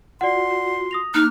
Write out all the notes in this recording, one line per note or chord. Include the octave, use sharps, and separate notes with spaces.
F4 F#4 D5 F#5 C6
D#6 A#6 F7
A#3 D#4 D6 F6 F#6